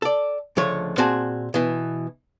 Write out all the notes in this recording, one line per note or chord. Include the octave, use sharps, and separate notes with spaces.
A4 D5
C#2 D3 F3 A3 C#5
A#2 C4 F#4 G#4 A5
B2 E3